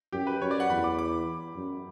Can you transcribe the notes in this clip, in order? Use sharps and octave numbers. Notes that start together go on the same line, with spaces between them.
F#2 G4
B4
F#2 C#5
D5
F#5
E2 B5
D6
D6
F#2